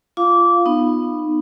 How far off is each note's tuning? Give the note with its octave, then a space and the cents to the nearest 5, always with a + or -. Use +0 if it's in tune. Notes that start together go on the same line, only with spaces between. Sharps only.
F4 -15 F5 +0 D6 -20
B3 +0 D#4 -25